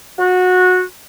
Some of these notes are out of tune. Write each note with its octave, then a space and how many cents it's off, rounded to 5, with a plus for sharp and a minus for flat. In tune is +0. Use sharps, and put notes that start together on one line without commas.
F#4 -20